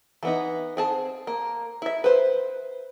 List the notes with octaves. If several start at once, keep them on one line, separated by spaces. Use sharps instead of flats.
E3 B3 D#4
C4 G#4 A5
A#3
E4 E5
B4 C5